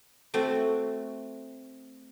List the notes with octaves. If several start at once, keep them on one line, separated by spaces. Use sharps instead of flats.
A3 C4 F#4